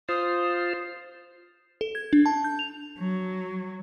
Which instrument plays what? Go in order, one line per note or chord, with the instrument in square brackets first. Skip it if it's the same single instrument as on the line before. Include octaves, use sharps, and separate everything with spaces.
[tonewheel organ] F4 C5 [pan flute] D#6
[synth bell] A4
G#6
D4
A5
G6
F7
[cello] F#3